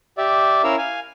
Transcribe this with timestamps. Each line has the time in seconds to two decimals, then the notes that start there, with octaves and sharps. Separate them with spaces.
0.18 G4 D5 E5
0.64 C#4 E4 A#4 F5 E6
0.78 F5 G#5